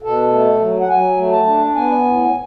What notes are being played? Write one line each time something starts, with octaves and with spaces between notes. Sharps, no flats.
B2 A4
A3
F#3
F#5
F#3 G#5
A3
A5
D4
B3 G#5
A2